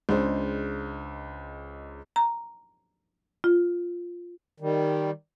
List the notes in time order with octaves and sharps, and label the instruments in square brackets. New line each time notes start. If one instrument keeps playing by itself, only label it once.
[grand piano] C#2 G#3 D4 C5
[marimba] A#5
F4
[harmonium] D#3 G3